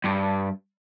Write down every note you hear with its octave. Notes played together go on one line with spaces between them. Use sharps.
G2